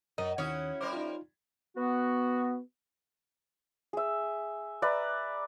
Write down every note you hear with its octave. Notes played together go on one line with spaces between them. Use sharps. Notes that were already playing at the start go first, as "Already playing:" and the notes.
F#2 F#3 A#4 D#5
D#2 D#3 C#4 E4 F#4 C#5 D#6
G3 A#4 C5 D6
D#4 F4
B3 F#4
G#4 E5
B4 D5 E5 A#5